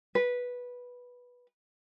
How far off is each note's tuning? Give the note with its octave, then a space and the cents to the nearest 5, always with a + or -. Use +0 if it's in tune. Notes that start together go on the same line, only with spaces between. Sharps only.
B4 -10